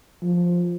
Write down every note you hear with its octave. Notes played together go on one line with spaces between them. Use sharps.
F3